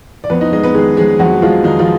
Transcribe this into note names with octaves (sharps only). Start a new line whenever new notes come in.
D5
F2 B3 B4
D#4 D#5
G#3 D#4 D#5
B3 B4
D#3 G#3 G#4
F2 G#3 G#4
F2 F#3 F#4
F3 G#3 F4
D#3 D#4
F3 F4